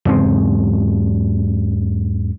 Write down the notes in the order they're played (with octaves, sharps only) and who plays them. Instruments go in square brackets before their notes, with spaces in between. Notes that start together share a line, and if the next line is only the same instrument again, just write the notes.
[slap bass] E2 G#2 C#3 C4